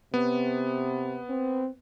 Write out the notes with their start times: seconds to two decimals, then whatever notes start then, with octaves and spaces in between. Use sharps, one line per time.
0.14 C3 B3
1.30 C4